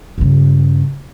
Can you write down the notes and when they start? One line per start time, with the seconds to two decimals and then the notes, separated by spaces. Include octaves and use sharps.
0.18 G2 C#3